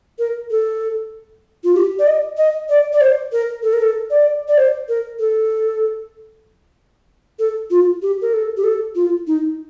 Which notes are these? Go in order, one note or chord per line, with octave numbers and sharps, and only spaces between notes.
A#4
A4
F4
G4
D5
D#5
D#5
D5
D5
C5
A#4
A4
A#4
A4
D5
D5
C5
A#4
A4
A4
F4
G4
A#4
A4
G4
A4
F4
D#4